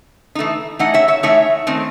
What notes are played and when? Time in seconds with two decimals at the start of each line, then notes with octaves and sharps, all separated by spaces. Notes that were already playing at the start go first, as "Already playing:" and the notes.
0.35 E3 A3 D#4
0.79 E3 A3 D#4 D#5 F#5
0.94 C#5 E5
1.08 C#5 E5
1.23 E3 A3 D#4 C#5 E5
1.67 D#3 A3 C4 D#4